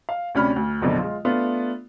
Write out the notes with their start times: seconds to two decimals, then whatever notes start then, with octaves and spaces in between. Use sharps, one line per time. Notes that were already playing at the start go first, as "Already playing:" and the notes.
0.09 F5
0.35 D2 C3 C#4 D4 B5 F6
0.56 D2
0.82 A#1 F#2 B2 D3
0.98 G#3 F4
1.25 A3 B3 D4 F4